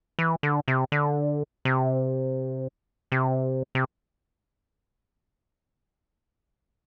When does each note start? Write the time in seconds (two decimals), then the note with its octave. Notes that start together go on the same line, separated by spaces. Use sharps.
0.19 E3
0.43 D3
0.68 C3
0.92 D3
1.65 C3
3.12 C3
3.75 C3